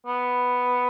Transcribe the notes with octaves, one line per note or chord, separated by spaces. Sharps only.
B3